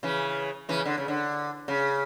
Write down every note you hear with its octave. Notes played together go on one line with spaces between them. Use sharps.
C#3 E3
C#3 E3
D3
C#3
D3
C#3